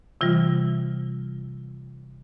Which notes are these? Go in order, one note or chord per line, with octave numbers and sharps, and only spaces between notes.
C3 E3 G3 F4